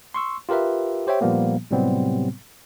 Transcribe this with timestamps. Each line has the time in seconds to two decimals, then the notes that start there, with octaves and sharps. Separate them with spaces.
0.14 C6 C#6 E6
0.49 F4 G4 A#4 B4 E5
1.07 G4 C5 C#5 E5 G5
1.21 A#2 F3 G3 A#3 B3
1.71 A2 C3 F#3 G3 B3 C4